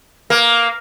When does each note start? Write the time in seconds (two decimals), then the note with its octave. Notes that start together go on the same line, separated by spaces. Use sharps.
0.30 A#3